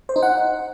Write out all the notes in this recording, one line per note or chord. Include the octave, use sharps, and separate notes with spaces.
C5
D#4
F#5